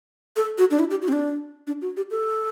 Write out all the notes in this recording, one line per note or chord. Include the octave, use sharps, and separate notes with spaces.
A4
F#4
D4
E4
G4
F#4
C4
D4
D4
F#4
G4
A4